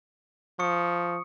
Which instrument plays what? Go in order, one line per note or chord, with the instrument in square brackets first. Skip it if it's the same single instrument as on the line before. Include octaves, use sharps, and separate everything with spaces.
[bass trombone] F3 [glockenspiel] C#6 D#6 C#7